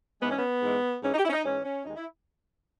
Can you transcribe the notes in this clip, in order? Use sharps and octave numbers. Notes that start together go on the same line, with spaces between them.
G#2 E3 G#3 B3
C#4
B3
G#2 E3 G#3
G#2 E3 G#3 C#4
D#4
G4
E4
C#4
D#4
G#2 E3 G#3 C#4
C#4
D#2 D#3 G#3 D#4
E4